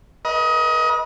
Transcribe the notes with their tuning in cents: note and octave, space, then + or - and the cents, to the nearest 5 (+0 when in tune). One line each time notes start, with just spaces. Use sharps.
B4 -40 D#5 +25